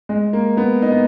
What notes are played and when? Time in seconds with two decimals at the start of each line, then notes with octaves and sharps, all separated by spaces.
0.09 G#3
0.33 A#3
0.57 B3
0.82 D#4
0.92 B3